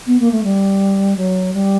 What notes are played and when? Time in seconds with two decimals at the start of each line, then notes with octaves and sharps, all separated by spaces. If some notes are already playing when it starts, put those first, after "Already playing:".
0.06 B3
0.19 A#3
0.31 A3
0.43 G3
1.16 F#3
1.53 G3